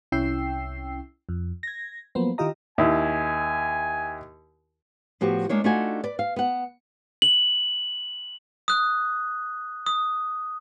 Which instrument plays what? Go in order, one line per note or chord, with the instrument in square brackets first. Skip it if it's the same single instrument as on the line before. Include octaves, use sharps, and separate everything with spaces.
[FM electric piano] C2 C#4 E4 G5 E6 C7
F2
G#6 A#6
F3 F#3 A#3 B3 C5
D#3 E4 F4 G4 D#5 A#5
[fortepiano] D#2 E4 [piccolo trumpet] G#5
[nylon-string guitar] A2 F3 B3 F#4 G4
G#3 A#3 D4 C#5
A3 D4 D#4 F4 F#4 G#5
B4 D5
F5
B3 F#5
[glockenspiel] F#7
D#6 F#6
D#6